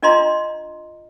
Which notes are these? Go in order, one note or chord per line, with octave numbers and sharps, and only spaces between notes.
D4 F4 D#5 A#5 C6